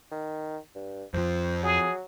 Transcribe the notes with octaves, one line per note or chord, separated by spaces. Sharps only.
D#3
G2
F2 F3 C5
F#3 G#4